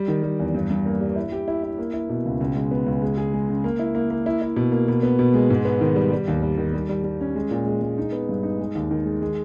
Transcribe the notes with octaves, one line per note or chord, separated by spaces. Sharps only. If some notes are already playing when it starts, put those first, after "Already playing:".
Already playing: G3
D#3
G3
E2
G2
G2
A#3
G3
E4
G4
E4
E4
A#3
E4
B2
C#2
C#2
G#3
B3
C#2
G#3
G#4
G#3
C#3
A#3
E4
A#3
A#3
E4
E4
B2
A#3
B2
B3
B2
G#3
G#2
B3
D#3
G3
G3
D#2
G3
D#3
G3
G3
G3
C#4
G#3
A#2
G#3
G#3
D#4
B3
G2
D#4
G#3
D#2
D#3
G#3
G#3